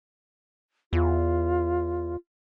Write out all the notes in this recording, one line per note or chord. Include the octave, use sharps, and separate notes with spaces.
E2 F4